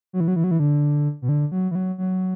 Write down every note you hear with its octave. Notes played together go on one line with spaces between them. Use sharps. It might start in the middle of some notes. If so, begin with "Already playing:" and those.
F#3
E3
F#3
E3
F#3
E3
D3
B2
D3
F#3
E3
F#3
F#3